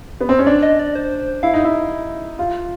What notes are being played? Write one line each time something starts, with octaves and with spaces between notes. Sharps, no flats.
B3
C4
C#4
D4 D5
D#5
D5
C5
E4 F5
D#4
E4
F4